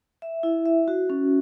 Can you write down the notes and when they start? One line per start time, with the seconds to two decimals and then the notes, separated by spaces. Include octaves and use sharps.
0.22 E5
0.43 E4
0.66 E5
0.88 F#4
1.10 C#4